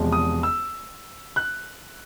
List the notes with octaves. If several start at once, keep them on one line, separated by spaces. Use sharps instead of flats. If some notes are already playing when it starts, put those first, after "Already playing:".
Already playing: E1 E2 C3 F3 G#3
D#6
E6
F#6